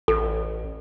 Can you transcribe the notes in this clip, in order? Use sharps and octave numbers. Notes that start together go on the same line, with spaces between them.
A1 A4